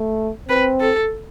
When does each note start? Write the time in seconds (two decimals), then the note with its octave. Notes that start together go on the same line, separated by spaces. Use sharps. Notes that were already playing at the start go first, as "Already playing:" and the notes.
Already playing: A3
0.48 C4 B4
0.80 A4